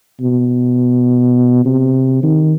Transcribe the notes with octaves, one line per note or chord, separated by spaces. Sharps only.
B2
C3
D#3